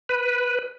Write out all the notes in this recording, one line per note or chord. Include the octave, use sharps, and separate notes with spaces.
B4